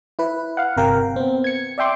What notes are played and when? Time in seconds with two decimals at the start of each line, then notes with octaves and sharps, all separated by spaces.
0.19 E4 B4
0.57 F5 F#5
0.77 G1 C3 A#4 F5 G5
1.16 B3 C4
1.44 G#6 C#7
1.78 D5 E5 G5 C6 D6